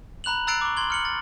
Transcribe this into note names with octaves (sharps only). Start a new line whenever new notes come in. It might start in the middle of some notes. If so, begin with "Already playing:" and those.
A#5 B5 F#6 F7 F#7
A#5 E6 F#6 A6 C7 D7
C#6 D6
C6 G#6 F#7 G7
F6 C#7 F#7
A6